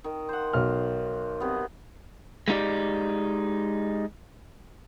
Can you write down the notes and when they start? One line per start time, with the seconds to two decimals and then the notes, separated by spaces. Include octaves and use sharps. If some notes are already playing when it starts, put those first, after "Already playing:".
0.04 D#3
0.29 C5 F#5
0.53 B1 F6
1.40 C3 B3
2.48 G#3 A#3 D#4 G4 D5